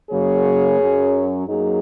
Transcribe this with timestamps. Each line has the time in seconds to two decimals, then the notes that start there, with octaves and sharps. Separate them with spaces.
0.10 F#2 C#3 F#3 A#3 G#4 C#5
0.80 F#2 F#3 C#4
1.47 F#2 F#3 A#3 D#4 G#4